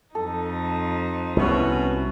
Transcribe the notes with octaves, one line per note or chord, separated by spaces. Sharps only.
F2 D#4 A4
C2 B2 C#4 E4 F#4